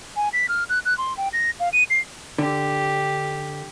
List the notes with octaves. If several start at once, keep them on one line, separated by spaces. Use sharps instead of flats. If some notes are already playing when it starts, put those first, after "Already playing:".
G#5
B6
F6
F#6
F#6
C6
G5
A#6
F5
D#7
C7
D3 G4